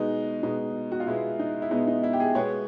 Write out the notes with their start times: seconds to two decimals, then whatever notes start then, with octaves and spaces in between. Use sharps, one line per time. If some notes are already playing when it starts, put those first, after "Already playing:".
Already playing: B2 G#3 B3 D#4
0.43 B2 G#3 B3 D#4
0.92 F#4
1.00 F4
1.07 B2 G#3 B3 E4
1.39 D#4
1.62 E4
1.71 B2 G#3 B3 D#4
1.87 D#4
2.03 E4
2.13 G4
2.20 G#4
2.35 B2 G#3 B3 C#5